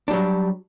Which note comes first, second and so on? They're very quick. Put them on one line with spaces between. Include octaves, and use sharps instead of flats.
D4 G3 F#3